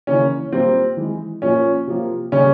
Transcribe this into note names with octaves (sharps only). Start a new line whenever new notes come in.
C#3 E3 A#3 C#4
A#2 G3 A#3 C4
E3 G#3
A#2 F3 A#3 C#4
C3 F3 A#3
C#3 G3 A#3 C#4